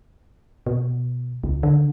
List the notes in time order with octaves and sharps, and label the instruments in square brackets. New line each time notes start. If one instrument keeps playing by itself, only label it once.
[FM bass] B2
C#2
D3